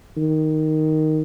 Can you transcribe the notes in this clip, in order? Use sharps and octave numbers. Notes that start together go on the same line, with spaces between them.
D#3